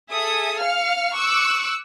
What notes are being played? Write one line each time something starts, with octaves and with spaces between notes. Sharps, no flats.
G#4 A4 E5 D#6
F5 F6 C#7
C#6 D6 E6 F#6 C#7 D7